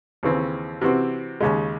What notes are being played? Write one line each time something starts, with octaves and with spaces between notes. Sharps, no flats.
D#2 C#3 E3 C4
C3 E3 C4 F#4
D#2 C#3 G#3